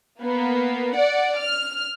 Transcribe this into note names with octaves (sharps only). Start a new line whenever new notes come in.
A#3 B3
D5 F#5
F6